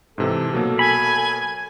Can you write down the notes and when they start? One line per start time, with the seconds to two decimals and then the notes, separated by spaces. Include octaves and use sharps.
0.18 G#2 C3 E3 A4
0.53 B2 F#3 A#3
0.79 G#5 B5